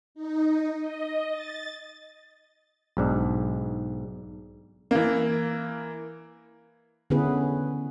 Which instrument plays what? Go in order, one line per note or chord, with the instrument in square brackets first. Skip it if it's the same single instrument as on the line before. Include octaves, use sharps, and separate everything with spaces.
[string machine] D#4
D#5
A6
[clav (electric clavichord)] B1 G#2 D4
[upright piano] E3 A#3
[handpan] D3 B3 C#4 E4 G#4 B4